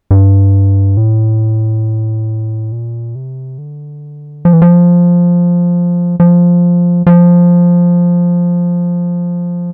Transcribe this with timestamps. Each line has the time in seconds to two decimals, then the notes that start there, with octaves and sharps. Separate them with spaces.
0.11 G2
0.97 A2
2.72 A#2
3.15 C3
3.58 D3
4.45 F3
4.53 E3
4.62 F3
6.20 F3
7.06 F3